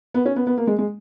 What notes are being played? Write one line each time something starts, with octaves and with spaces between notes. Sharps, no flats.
B3
C#4
B3
B3
A#3
G#3
G#3